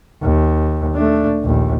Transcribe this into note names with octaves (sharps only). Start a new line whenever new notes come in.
D#2
A3 D4
A#1 D#2